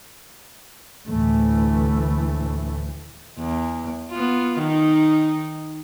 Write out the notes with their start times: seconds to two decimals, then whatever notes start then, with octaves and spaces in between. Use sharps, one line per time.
1.07 D2 A2 E3 A3
3.39 E2
4.12 B3 F4
4.60 D#3 D#4